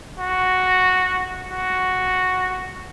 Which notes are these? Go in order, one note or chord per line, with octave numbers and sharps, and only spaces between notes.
F#4
F#4